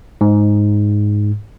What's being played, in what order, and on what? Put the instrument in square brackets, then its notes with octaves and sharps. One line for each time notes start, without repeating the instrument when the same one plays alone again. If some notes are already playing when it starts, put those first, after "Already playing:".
[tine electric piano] G#2